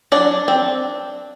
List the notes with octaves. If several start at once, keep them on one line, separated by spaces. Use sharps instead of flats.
F#3 D4 D5
C4